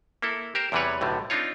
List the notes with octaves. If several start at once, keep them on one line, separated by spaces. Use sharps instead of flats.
A#3 E4 A4
G4 A#4 C5
E2 C3 E3 G3 B4 C#5
B1 A2 D3 G3
C4 D4 D#4 F4 C#5